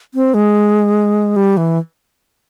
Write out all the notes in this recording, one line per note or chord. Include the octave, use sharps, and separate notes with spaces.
C4
G#3
G3
E3